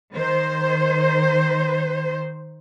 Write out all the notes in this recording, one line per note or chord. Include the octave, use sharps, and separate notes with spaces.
D#3 C5